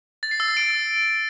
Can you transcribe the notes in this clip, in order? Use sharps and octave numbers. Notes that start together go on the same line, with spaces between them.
A6
C7
E6
A6
D7